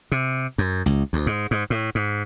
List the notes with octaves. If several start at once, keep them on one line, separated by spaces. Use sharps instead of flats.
C3
F#2
C#2
D2
G#2
G#2
A2
G#2